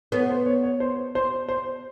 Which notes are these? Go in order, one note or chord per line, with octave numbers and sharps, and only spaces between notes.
B3 C#5
C5
C#5
C#5
C5
C5
C5